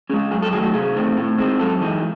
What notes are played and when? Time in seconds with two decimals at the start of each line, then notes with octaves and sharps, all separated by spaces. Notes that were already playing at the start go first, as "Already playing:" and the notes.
0.10 C#4 G#4
0.13 G#3
0.31 F#2 G#4
0.42 A4
0.53 D#3 F#3 A3 G#4
0.63 F#4
0.74 C3 G#4
0.96 D#3 A3 C4
1.17 A2
1.38 G#3 C4 D#4
1.59 F#2 A4
1.81 E3 G#3 D#4